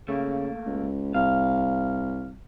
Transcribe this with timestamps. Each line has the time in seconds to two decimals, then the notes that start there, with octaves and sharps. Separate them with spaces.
0.08 C#3 A3 A#3
0.66 C#2
1.14 C2 F5